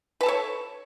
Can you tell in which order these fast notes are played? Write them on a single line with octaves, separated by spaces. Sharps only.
B4 A5 A4 C#5